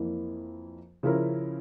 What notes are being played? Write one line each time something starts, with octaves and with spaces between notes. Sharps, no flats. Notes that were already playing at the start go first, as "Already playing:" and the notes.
Already playing: F2 E3 A#3 E4 A#4
C#3 F3 C#4 E4 A#4